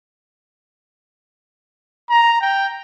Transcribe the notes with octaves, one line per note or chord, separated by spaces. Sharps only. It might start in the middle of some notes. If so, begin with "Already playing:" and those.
A#5
G5